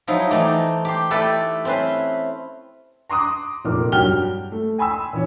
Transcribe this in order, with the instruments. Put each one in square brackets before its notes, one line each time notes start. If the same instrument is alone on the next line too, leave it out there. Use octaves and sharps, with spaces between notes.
[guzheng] F3 F#3 D#4 E4
E3 A3 D#4 D5 G5
G4 C6
A3 E4 A4 B4 D5 G5
C4 C#4 E4 B4 C6
[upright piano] A#5 C6 D6 D#6 F#6
F1 A#2 D#4 A#4 D6
G2 F#3 G4 G5 F6 G7
A3
G5 G#5 B5 C6 E6
A#2 E3 C#4